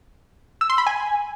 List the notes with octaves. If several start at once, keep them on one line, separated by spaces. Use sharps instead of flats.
E6
C6
B5
G#5